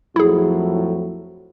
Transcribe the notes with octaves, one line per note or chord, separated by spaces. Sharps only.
F2 A2 F#3 E4 G#4